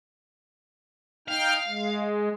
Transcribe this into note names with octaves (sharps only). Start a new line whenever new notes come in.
D#4 F5 G5 F6
G#3